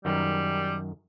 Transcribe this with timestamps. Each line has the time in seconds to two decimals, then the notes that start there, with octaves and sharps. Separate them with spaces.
0.05 F#2 D#3 G3